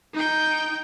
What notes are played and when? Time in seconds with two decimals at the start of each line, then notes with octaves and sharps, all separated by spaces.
0.14 D#4 G5